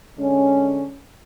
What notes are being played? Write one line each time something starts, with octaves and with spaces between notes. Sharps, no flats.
D3 G#3 C#4